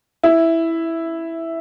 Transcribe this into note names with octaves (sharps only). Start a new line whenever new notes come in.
E4